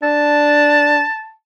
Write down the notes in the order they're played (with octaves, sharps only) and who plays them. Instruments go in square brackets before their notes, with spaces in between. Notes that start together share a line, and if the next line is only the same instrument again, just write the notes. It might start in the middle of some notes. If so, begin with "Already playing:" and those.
[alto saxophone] D4 [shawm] A5